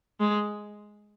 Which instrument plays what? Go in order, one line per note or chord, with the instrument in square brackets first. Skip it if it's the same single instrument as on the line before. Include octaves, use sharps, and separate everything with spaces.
[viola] G#3